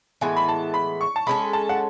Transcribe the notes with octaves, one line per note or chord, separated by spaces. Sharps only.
A2 E3 G#3 B3 G#5
B5
A5
B5
C#6
A5
G#3 C#4 E4 A4 B5
A5
F#5